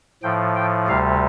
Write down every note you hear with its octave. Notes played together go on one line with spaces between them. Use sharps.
A2 F3 G5
G5
D2 C3 G3 F5